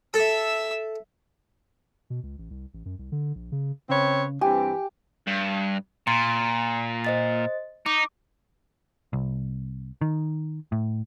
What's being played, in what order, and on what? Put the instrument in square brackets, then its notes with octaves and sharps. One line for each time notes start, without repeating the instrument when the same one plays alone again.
[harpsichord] A4 [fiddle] E5 E6
[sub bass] B2
C#2
A1
C2
A1
F#2
C2
D3
A#1
C#3
[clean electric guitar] C#3 [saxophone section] C4 B4 C#5
[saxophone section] G2 E3 C4 [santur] G4 [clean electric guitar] G#5
[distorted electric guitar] G2
[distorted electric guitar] A#2 [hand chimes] A#5 C6 A6
[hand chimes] C5 D#5 A6
[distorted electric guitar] D#4 [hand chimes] D6
[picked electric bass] C2
D#3
A2